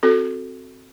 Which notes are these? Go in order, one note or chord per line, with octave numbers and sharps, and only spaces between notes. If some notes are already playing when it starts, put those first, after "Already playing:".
C4 F#4 A4